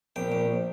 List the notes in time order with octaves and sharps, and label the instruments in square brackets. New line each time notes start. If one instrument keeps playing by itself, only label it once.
[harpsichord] A#1 G5
A#1